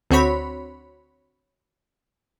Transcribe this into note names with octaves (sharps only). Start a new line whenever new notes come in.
D2 C4 F#4 C#5 B5